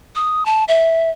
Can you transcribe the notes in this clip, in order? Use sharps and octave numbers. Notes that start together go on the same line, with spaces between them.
D#6
A5
E5